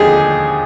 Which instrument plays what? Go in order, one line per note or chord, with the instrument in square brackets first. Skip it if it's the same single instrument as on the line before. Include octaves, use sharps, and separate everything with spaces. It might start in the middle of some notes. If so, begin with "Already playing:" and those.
Already playing: [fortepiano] D#2 D3 F3 G#3 G4 G#4